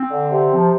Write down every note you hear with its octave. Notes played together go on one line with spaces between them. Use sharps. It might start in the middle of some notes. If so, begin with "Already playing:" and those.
Already playing: C4
D3
C3
F3